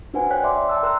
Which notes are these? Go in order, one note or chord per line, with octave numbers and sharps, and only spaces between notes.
D4 F#4 B4 C5 F#5 G#5
C#5 G5 F#6 B6
D5 E5 C6 D6
G5 A5 E6
A#4 A#5 C6 E6 F#6